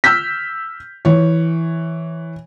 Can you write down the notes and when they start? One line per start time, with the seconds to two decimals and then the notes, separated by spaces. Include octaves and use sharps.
0.04 E6 F6 G6 B6
1.05 E3 C#5